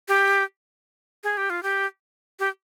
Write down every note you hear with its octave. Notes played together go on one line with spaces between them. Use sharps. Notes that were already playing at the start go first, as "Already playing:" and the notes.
G4
G#4
G4
F4
G4
G4